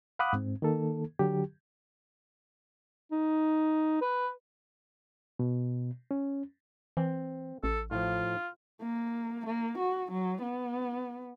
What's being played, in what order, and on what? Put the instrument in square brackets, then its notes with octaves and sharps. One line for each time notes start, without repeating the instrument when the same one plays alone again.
[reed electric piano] F5 F#5 B5 D6 D#6 F#6
G#2 C4
D#3 A#3 A4
D3 F#3 G4
[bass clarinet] D#4
B4
[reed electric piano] B2
C#4
[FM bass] E3 [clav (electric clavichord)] C4
[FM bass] A1 [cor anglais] A4
[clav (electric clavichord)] A2 F3 [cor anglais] F4
[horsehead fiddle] A#3
A#3
F#4
F#3
B3